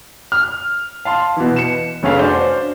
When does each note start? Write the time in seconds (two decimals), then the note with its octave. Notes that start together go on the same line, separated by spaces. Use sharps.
0.32 F6
1.05 F5 A5 C6
1.36 B2 E3
1.56 C#7 E7
2.03 F1 A3 C#4 G#4 B4 F5
2.19 D4 F#4 C5